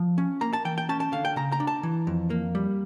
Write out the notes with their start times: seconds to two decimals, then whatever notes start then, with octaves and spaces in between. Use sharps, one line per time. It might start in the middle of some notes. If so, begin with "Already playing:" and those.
Already playing: F3
0.18 C#4
0.41 A#3 A#5
0.53 A5
0.65 E3 G5
0.78 G5
0.89 C#4 A5
1.00 A5
1.12 D3 F5
1.25 G5
1.36 C#3 A#5
1.52 A#5
1.60 D4
1.67 A5
1.83 E3
2.07 F2
2.30 A#3
2.55 G3